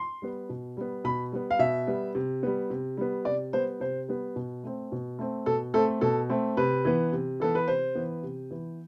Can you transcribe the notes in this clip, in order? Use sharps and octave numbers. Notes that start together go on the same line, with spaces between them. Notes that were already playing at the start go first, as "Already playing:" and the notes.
Already playing: C6
G3 B3
B2
G3 B3
B2 B5
G3 B3
F5
B2 E5
G3 B3
C3
G3 B3
C3
G3 B3
C3 D5
G3 B3 C5
C3 C5
G3 B3
B2
A3 C4
B2
A3 C4
B2 A4
A3 C4 A4
B2 A4
A3 C4
C3 B4
E3 B3
C3
E3 B3 A4
B4
C3 C5
E3 B3
C3
E3 B3